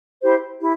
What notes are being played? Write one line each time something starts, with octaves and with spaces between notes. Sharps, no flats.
E4 G4 C5
E4 G4